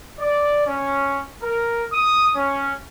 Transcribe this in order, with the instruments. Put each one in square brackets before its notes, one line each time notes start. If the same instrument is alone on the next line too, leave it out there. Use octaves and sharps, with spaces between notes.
[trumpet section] D5
C#4
A#4
D#6
C#4